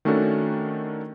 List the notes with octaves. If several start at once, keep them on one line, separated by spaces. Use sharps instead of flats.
D#3 A3 C#4 D4 F#4 A4